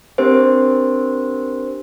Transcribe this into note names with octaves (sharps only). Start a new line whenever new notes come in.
C4 D4 G4 A#4 C5